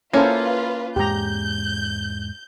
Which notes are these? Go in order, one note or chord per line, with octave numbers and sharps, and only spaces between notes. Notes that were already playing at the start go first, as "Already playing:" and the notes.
A#3 C#4 E4 F4 A4 B4 C5
E2 G#2 G#3 G4 A#5 G6